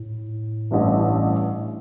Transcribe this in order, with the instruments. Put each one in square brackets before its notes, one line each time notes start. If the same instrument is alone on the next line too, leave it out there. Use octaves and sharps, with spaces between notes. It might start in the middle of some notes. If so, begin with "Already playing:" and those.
Already playing: [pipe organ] A2
[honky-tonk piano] A1 G2 E3